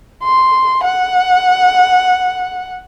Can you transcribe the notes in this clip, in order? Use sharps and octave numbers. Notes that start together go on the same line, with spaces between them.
C6
F#5